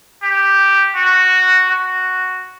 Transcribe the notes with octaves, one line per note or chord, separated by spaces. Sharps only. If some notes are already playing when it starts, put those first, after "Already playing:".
G4
F#4
F#4